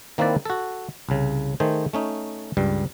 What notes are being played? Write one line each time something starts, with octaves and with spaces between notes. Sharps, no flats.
D#3 A#3 C4 E4 B4 D5
F#4 A4
C2 C#3
D#3 A3 G#4 C5
A3 C#4 D#4
C#2 G2 G3